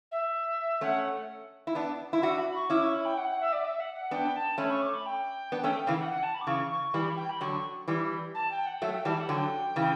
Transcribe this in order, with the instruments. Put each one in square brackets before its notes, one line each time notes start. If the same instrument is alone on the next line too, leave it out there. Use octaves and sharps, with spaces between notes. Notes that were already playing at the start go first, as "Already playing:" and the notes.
[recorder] E5
[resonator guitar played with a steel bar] A3 C#4 [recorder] F#5
[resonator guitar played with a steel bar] E4
B3 D4
E4
[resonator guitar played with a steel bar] D4 F#4 [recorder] E5
[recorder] B5
C#6
[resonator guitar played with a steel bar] C#4 E4 [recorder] D6
[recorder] C#6
B5
G5
F#5
F#5
E5
D5
E5
F#5
F#5
[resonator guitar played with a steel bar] B3 D4 [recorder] G5
[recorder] A5
[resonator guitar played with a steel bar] A3 C#4 [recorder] B5
[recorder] C#6
D6
B5
G5
[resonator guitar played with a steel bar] B3 D4
A3 C#4
C#3 E3
[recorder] F#5
F#5
A5
B5
D6
[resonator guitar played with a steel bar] C#3 E3 [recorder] C#6
[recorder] C#6
[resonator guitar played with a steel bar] E3 G3 [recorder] B5
[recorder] G5
B5
[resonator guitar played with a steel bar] D3 F#3 [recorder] C#6
[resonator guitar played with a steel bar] E3 G3
[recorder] A5
G5
F#5
[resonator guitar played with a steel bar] F#3 A3 [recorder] E5
[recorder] G5
[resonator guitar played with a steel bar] E3 G3 [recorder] A5
[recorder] F#5
[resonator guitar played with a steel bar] D3 F#3 [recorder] G5
[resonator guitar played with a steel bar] C#3 E3